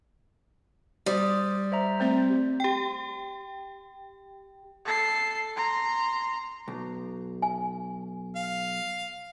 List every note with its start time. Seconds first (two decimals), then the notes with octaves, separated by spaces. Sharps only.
1.06 G3 C5 D5 D#6
1.72 C5 E5 A#5
2.00 A3 C4 C5 E5
2.60 G4 G5
4.85 A4 C7
5.56 A#5 C6
6.68 B1
7.42 G#5
8.36 F5